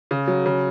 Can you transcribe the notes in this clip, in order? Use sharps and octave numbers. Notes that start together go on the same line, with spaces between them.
C#3
F#3
C#3